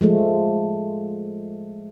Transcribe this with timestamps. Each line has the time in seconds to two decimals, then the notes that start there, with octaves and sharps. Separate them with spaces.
0.01 F3 G#3 A3